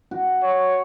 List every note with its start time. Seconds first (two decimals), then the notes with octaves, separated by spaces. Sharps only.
0.11 F#4
0.44 C#5